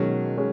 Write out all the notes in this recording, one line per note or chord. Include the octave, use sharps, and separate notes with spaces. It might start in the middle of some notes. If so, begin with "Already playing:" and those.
Already playing: B2 D#3 F#3 G#3 C#4
G#3 C#4